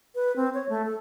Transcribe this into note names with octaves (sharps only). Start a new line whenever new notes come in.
B4
C4
C#5
A3
A4